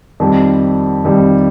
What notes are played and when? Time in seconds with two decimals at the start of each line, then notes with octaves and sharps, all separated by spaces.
0.20 F2 D#3 G3
1.04 F2 D#3 G3